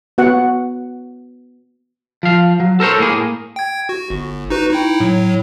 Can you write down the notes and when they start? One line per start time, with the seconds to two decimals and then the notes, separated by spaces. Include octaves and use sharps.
0.18 B3 F#4 F#5
2.23 F3 F5
2.60 F#3
2.80 A4 A#4 C5 C#5
2.98 A2 A#3 G#4
3.56 G5 G#6
3.89 F#4
4.10 G1
4.50 D#4 F#4 B4
4.70 D#4 E4 G5
5.00 A2 F#3